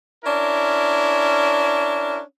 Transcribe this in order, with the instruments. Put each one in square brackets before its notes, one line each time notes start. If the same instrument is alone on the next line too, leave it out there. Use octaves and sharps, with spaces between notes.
[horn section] C#4 D4 E4 A#4